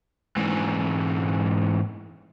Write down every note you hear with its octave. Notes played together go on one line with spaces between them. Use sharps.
G#2 E3